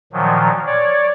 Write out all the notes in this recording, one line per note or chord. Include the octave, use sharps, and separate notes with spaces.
A#2 D#3 F3 F#3
C#5 D5